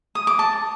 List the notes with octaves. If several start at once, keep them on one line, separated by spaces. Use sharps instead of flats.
D#6
D6
A5